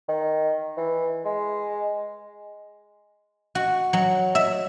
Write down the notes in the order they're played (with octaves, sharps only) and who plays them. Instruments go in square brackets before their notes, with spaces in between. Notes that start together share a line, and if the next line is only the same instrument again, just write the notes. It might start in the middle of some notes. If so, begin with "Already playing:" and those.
[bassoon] D#3
E3
G#3
[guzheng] F#4
F#3
E5